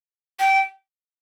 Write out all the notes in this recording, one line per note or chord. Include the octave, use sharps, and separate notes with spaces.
G5